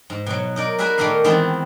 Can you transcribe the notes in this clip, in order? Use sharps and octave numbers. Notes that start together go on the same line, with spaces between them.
G#2
B2 F#3
D#4 A#4 D5
F#4 G#4 A#4 B4 E5 G#5
A#2 D#3 A3 A#3 D#4 F5
D#3 E3 G#3 B3 C4 F4